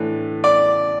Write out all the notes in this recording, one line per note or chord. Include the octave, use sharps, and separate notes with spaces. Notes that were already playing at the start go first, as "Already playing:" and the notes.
Already playing: A2 E3 A3 D4
D5